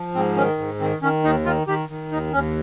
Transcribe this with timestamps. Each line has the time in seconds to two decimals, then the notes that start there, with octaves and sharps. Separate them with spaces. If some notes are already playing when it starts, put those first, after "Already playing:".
Already playing: F3
0.14 G#2 C4
0.36 D#3 C#4
0.58 G#2
0.80 D#3 C4
1.02 D#3 C#4
1.24 D#2 D#4
1.45 D#3 F4
1.67 D#3 G4
1.89 D#3
2.12 D#2 D#4
2.33 D#2 C#4